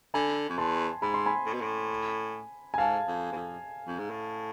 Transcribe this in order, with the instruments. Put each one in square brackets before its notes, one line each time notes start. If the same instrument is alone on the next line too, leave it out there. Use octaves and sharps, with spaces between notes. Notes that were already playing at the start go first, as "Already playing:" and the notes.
[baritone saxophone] D3 [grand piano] G#5 B5
[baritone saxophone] F2
[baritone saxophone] E2 [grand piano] A5 C6
[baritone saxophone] G#2 [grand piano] B5
[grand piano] C6
G#5 B5
[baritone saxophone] A2
B2
A2
[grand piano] G#5
[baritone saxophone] G#2 [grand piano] F5 A5
[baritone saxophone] F2
E2
F2
F2
G#2
A2